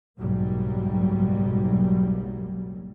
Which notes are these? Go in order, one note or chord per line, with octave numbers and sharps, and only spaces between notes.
F#1 B1 G#2 F#3 G3 A#3